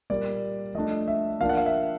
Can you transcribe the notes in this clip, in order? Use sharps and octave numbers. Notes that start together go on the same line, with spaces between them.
A#2 G3 A#3 D5
F3 A3 D4 D#5
E5
F3 A#3 D4 F5
F#5
F5
E5